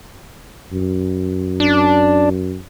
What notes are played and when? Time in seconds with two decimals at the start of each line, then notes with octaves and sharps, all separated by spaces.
0.73 F#2
1.60 D4